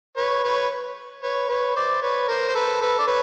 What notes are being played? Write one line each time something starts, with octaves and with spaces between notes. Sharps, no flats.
B4 C#5
B4 C#5
B4 C#5
B4 C#5
C5 D5
B4 C#5
A#4 C5
C5
A4 B4
A4 B4
D5
B4 C#5